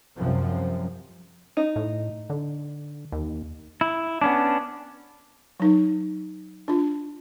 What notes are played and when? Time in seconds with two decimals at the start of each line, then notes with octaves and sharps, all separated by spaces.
0.16 C2 F#2 C3 F3
1.57 D#4
1.76 A2
2.30 D3
3.12 D#2
3.81 E4
4.21 B3 C#4 D4
5.60 F#3 D#4
6.68 D4 F4